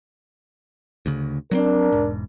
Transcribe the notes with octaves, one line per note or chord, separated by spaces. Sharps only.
D2 C#3
F#3 B3 C4 D4 A#4
E1 G#2